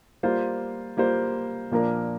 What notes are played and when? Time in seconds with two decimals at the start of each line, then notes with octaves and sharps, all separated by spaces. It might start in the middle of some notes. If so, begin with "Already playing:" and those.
0.23 G3 A#3 F4 C5
0.97 G3 A#3 F4 C5
1.71 A#2 F3 A#3 D4 A#4